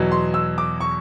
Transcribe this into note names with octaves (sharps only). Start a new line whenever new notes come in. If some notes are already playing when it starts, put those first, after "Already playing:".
Already playing: E2 B2 F#3
C6
E6
D6
C#6